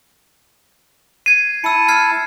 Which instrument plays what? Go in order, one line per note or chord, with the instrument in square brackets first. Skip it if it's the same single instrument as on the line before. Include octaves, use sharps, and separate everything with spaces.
[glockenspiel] G#6 C7 [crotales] D#7
[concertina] E4 A5 [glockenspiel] E6 C#7
[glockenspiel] F6 G#6 C7